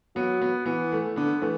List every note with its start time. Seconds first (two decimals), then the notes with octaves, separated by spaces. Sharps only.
0.16 F#3 B3
0.42 B3
0.66 E3 B3
0.92 A3
1.16 D3 B3
1.42 E3 A3